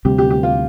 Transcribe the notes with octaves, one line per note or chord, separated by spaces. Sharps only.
D2 C3 G3 C4 G4
G4
G4
F4